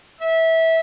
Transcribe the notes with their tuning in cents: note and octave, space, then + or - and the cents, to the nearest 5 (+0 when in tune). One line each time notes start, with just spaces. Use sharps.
E5 -20